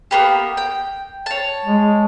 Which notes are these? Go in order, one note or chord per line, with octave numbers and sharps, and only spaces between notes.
A#3 B3 G4
G5
C#5 A5
G#3